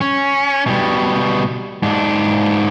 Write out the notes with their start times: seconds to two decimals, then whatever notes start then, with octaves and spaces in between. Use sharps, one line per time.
0.01 C#4
0.66 B2 G3
1.83 G#2 D4